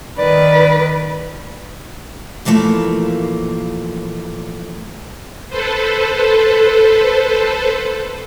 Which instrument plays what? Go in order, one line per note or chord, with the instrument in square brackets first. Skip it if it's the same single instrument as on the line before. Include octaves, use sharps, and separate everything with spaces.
[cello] D#3 B4 [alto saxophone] D5
[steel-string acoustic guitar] A#2 E3 F3 A3 A#3
[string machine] A4 B4 C5